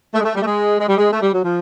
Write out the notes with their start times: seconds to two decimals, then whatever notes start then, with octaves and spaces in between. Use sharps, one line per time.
0.14 A3
0.20 G#3
0.25 A3
0.35 G3
0.42 A3
0.46 G#3
0.79 G#3
0.88 G3
0.97 G#3
1.11 A3
1.22 G3
1.34 F#3
1.44 F3